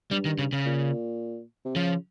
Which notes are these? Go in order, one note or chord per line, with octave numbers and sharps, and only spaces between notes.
G2 G3
D#3
C#3
C#3
A#2
C3
C#3 F3